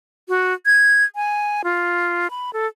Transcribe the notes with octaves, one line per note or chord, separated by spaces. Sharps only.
F#4
G#6
G#5
F4
B5
A4